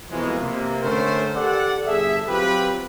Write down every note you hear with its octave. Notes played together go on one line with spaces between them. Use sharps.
F2 B2 E3 F3 G#3 A#3
C3 A#3
D3 A3 C#4 A#4 C5
G4 A4 D5 F#5
G1 G#4 A4 E5
F#3 C4 F4 G4 B4